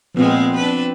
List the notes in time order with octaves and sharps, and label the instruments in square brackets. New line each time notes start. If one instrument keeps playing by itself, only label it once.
[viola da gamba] A#2 G#3 [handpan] F3 B3 C4
[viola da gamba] D4 B4